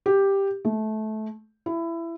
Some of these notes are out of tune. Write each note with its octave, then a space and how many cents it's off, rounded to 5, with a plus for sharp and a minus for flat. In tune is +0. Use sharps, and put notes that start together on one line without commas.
G4 +5
A3 -20
E4 +20